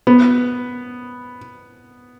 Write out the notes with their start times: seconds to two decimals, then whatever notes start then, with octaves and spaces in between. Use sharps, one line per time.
0.07 B3